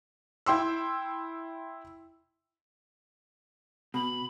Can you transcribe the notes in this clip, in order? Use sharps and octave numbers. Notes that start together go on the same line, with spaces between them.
E4 G5 C6 E6
B2 B5